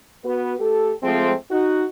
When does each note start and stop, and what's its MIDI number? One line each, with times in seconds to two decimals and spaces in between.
0.24 0.53 59
0.24 0.53 66
0.24 0.53 71
0.59 0.92 57
0.59 0.92 67
0.59 0.92 69
1.02 1.32 53
1.02 1.32 56
1.02 1.32 57
1.02 1.32 60
1.50 1.84 63
1.50 1.84 66